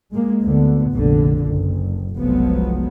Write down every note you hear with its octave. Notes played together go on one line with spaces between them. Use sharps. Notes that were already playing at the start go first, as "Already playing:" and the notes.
G#3 A#3
D2 D3 B3
F1 A#1 D3
F#1
F1 B1 F3 F#3 G#3 B3